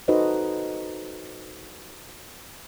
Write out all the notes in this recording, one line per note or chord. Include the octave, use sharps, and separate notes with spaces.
D#4 F#4 A4 B4 C5 D#5